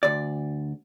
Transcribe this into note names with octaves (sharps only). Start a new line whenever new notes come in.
D2 D5